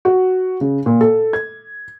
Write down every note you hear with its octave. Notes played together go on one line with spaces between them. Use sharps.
F#4
C#3
A#2
A4
G#6